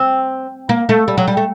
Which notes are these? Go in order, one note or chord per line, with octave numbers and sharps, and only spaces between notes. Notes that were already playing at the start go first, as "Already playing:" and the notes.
Already playing: C4
A#3
A3
G3
F#3
G3
A3